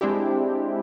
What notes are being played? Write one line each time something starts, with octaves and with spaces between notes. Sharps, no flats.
G#3 C4 D4 E4 G4